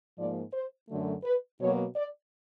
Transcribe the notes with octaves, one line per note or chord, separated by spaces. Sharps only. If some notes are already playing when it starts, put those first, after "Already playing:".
G#2 F3 A#3 D5
C5
F#2 D3 F#3 A3
B4
B2 F#3 A#3 C#5
D5